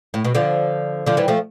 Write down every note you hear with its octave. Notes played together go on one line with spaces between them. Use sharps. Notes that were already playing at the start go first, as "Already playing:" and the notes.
A2
B2
D3 F3
D3 F3
E3 G3
F3 A3